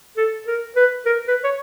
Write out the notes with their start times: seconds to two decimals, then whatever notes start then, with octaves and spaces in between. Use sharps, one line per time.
0.18 A4
0.47 A#4
0.76 B4
1.06 A#4
1.28 B4
1.44 C#5